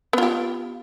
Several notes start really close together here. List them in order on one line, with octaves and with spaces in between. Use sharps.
B3 F4 G4